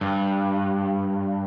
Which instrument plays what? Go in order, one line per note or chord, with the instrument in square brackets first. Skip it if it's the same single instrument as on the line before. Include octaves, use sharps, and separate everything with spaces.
[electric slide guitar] G2